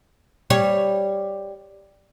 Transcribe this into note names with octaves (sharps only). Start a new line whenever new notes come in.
G3 C#5